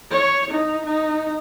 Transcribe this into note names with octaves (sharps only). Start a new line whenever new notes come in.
C#5
D#4
D#4